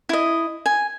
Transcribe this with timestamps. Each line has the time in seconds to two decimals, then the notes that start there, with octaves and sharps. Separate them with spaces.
0.09 E4 D#5
0.66 G#5